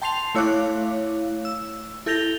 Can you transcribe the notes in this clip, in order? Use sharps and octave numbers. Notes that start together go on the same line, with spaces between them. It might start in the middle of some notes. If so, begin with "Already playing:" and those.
G5 A5 C6 C7 F7
A3 E4 C#5 F5 D6 F#6
E6
E4 A4 G6 A#6 F7 G7